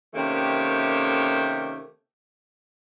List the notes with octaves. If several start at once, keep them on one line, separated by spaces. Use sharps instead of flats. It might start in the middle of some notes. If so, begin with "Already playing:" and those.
C3 D#3 A3 A#3 C#4 G4